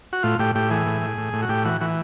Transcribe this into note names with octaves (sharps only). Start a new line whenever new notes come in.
F#4
A2 F4
A2 G4
A2 G4
E3 G#4
A2
A2
A2
A2
F#4
A2 G4
E3 F#4
E3 F#4